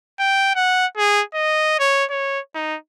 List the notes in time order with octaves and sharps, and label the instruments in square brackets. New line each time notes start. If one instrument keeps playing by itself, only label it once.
[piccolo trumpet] G5
F#5
G#4
D#5
C#5
C#5
D#4